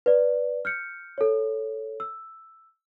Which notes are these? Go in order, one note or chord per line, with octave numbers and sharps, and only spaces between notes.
B4 D5
F6 G6 C#7
A4 C#5
E6